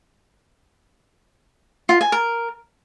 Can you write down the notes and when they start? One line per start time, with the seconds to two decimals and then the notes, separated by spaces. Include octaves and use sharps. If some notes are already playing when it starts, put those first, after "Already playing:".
1.89 F4
2.01 G#5
2.12 A#4